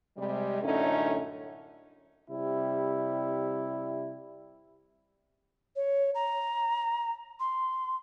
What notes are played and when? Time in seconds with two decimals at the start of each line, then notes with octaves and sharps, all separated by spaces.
0.17 C3 G3 G#3
0.62 F#2 A2 D3 A3 C#4 D#4
2.30 C3 G3 E4
5.76 C#5
6.14 A#5
7.39 C6